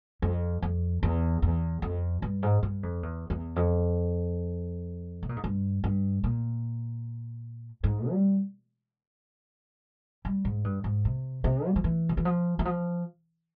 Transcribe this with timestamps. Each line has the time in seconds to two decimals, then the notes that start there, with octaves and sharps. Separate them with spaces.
0.22 F2
0.62 F2
1.03 E2
1.42 E2
1.82 F2
2.22 G2
2.43 G#2
2.63 G2
2.83 F2
3.03 E2
3.30 E2
3.56 F2
5.23 C3
5.29 A#2
5.36 G#2
5.44 G2
5.84 G2
6.24 A#2
7.84 G#2
8.11 G3
10.25 G3
10.45 G#2
10.64 G2
10.84 G#2
11.05 C3
11.44 C3
11.67 G3
11.76 F3
11.84 E3
12.09 C#3
12.17 E3
12.25 F3
12.59 E3
12.65 F3